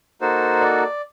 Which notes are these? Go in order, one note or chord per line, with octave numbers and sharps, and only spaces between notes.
A#3 D#4 F#4 A4 C5
D5